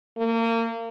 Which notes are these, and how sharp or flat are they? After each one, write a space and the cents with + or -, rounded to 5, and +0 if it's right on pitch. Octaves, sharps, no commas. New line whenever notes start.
A#3 -30